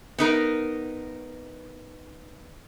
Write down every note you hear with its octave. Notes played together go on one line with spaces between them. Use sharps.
B3 D#4 A#4